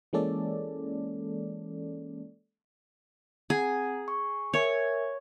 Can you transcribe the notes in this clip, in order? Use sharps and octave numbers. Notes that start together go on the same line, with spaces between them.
E3 G#3 A#3 C#4 A4 D5
C4 G#4 F#5 A#5
C#6
A#4 C#5 E5 G#5